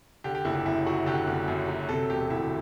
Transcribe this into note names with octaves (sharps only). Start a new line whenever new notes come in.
D3 G4
G4
F#1 E4
E4
F#2 E4
F#3 F#4
D3 G4
F#1
F#2
F#3
C3 A4
E1 G4
D2 E4